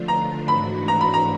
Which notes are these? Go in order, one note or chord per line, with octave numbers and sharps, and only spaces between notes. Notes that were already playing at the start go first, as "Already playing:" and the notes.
Already playing: D3 F3 A3 D4 F4
A#5
G#2 E3 A3 D4 F#4 B5
A#5
B5
A#5